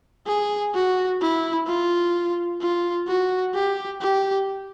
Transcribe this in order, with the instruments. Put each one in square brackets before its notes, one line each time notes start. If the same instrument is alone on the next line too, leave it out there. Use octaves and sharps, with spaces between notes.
[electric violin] G#4
F#4
E4
F4
F4
F#4
G4
G4